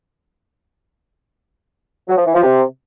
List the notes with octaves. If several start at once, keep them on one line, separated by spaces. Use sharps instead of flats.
F#3
F3
E3
F3
C3